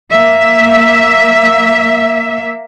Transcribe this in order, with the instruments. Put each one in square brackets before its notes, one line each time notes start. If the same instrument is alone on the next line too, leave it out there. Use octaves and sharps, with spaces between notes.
[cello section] A#3 E5